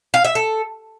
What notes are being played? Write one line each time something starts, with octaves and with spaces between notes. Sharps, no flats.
F5
E5
A4